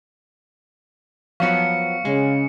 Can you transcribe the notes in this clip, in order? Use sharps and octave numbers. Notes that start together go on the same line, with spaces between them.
F3 F#3 B3 F5 C#6 C#7
C#3 G#3